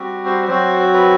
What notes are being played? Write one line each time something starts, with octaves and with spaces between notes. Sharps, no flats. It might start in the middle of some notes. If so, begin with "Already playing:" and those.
Already playing: G3 C4 F#4
C5
F#3 C4 F#4 C5
B4